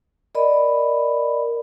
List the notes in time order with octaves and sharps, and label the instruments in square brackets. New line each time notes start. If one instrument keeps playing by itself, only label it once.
[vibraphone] A#4 D5 D#5 B5